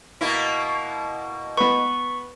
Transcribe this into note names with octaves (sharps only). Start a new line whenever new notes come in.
B2 A#3 E4
B3 B4 C#6